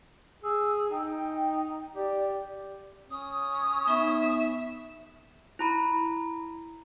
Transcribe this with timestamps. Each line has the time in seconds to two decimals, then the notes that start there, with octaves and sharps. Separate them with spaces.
0.43 G#4 E6
0.90 D#4 G5
1.95 G4 D5
3.11 C#4 D#6
3.87 B3 D#4 E5
5.59 E4 A#5 B5